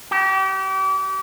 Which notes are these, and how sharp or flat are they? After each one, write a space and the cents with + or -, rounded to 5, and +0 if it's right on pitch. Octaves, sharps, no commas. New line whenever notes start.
G4 -35